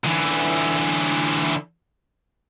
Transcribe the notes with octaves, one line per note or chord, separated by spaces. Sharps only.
D3 E3